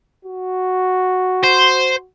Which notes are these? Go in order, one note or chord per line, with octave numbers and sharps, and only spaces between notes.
F#4
C5